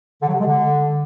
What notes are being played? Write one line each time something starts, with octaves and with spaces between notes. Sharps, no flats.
D3
F#3
C3
G#3
D3